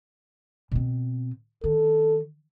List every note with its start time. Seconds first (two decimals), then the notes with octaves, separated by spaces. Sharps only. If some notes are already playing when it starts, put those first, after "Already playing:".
0.72 B2 C4
1.64 D#3 A4